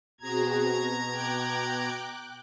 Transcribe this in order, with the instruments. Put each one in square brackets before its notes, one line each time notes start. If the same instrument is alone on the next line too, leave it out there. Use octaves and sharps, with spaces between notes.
[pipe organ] B2 A#5 G#6 [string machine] C4 F#4 G#4
[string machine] A#6
G5 D6 F#6